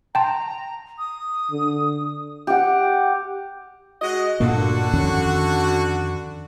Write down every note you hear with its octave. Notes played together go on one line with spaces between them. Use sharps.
G5 A5 A#5 C6
D#6
D3
G4 F#5
G#3 F#4 D#5
G2 A#2 D3 A#3 F#4
F2 D#3 C#4